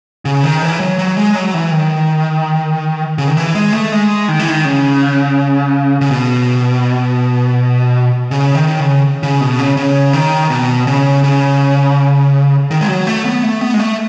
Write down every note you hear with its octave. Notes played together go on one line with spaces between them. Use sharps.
C#3
D#3
E3
F#3
F#3
G#3
F#3
E3
D#3
C#3
D#3
E3
G#3
A3
G#3
D#3
E3
D#3
C#3
C#3
B2
C#3
D#3
C#3
C#3
B2
C#3
C#3
D#3
B2
C#3
C#3
D#3
G#3
F#3
A3
B3
A3
B3
G#3
A3